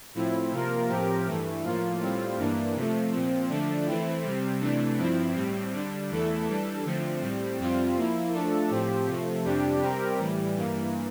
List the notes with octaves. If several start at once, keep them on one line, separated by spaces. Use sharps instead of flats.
A2 F3 C4 E4
C3 F3 A#3 F4 A#4
A2 F3 C4 G4 A#4
G2 E3 A3
A2 F3 A#3 F4
A2 G3 C4 F4
G2 E3 A#3 D4
C3 F3 A3
A#2 F3 C4
D3 F3 A3 D4
E3 A3 C4 E4
C3 G3 C4
C3 E3 A3 D4
G2 F3 C4 E4
A2 G3 C4
D3 G3 D4
E2 E3 A3 E4 A4
E3 G3 D4 A4
D3 F3 A3 C4
A2 G3 C4
F2 C3 G3 C4 F4
F3 A#3 E4
F3 A3 D4 A4
A2 F3 C4 G4
C3 F3 A3
F2 C3 G3 D4 G4
C3 G3 C4 G4 A#4
A2 E3 G3
G2 E3 A#3